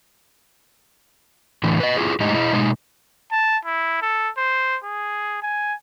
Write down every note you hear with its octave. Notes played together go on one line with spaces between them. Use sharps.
A2 D3 E3
B4 D#5
E4 F4 G#4
A2 G#3 D#4 G4 D#5
E4 G#4 D#5
B2 G#3 D#4
A5
E4
A4
C5
G#4
G#5